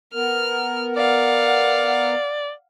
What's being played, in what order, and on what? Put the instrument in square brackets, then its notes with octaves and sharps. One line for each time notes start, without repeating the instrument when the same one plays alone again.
[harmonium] B3 A#4 [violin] F6
[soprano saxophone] D5 [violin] F5 F#5